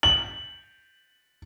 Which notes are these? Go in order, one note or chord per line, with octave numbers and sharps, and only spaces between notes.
F#7